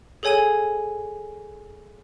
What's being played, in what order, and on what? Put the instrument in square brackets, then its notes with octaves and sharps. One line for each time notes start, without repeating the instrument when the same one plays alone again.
[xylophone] G#4 A4 C#5 G#5 G#6 D#7